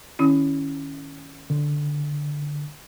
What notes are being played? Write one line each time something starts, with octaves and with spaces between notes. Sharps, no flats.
D#3 C#4 E4
D3